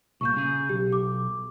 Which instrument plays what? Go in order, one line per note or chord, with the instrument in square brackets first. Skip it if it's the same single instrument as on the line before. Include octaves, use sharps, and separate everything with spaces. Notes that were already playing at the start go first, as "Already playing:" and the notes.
[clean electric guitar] C2 A#2 [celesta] C#6 G6
[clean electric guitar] C#3 G#4
[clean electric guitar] B1 [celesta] G4
[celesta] D6